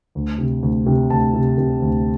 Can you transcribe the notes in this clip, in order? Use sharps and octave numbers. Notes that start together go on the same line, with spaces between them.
D2
C3
D2
C3
D2 A5
C3
C3
D2